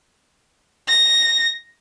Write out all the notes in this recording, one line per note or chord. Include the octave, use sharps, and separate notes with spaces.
A#6